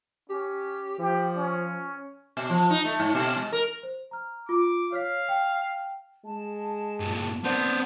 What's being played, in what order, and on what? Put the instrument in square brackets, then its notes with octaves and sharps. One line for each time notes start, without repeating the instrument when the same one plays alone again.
[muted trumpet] C#4 [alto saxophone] G4
[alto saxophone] F3 [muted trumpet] G4
[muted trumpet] C#4
[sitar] B2
F3
D#4
A3
G#2
B2
G#3
A#4
[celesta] C5
A#5 F6
[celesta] F4 [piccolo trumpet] D6
[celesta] C#5 F6 B6 [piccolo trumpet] F5
[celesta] G5
[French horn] G#3 [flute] A5
[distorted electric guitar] G2 A#2
[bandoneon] B3 D4 C5 [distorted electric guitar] C4 B4